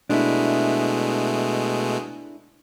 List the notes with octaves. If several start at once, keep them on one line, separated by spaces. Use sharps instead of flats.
B2 G#3 A3 D4 E4